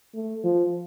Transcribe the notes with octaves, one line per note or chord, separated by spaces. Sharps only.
A3
F3